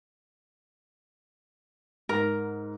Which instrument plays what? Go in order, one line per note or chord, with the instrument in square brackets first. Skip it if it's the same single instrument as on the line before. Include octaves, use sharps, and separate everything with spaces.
[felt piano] G#2 [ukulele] A#4